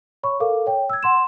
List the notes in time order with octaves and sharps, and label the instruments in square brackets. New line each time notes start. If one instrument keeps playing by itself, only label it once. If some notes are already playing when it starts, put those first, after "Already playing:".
[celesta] C#5 B5 C#6
A4 A#4 F5 D6
C#5 G5
E6 G#6
F#5 C6 E7